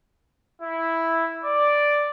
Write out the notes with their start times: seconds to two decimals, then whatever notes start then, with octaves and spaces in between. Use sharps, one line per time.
0.61 E4
1.42 D5